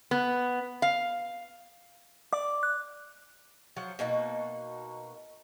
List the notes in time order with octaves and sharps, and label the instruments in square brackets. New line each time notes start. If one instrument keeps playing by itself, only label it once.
[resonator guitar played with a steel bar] B3
F5
[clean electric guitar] D5 [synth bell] D6
[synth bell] F#6
[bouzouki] F3 F#3 F#5
B2 A#3 D#4 F#4